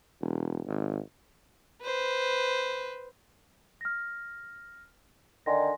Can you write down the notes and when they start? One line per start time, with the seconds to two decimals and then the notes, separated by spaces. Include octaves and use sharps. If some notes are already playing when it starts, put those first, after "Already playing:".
0.21 E1
0.67 G#1
1.82 B4 C5
3.81 F6 A#6
5.46 D3 D#3 G#5 C6 A#6